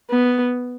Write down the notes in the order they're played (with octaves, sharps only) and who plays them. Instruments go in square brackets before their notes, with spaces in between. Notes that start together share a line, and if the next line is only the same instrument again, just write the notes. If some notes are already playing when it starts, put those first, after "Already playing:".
[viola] B3